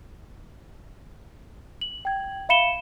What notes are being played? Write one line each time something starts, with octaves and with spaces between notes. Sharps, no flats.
F#7
G5 G#6
E5 F5 B5 C#7 E7 G7